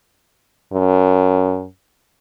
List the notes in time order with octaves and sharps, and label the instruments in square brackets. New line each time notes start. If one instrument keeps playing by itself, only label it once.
[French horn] F#2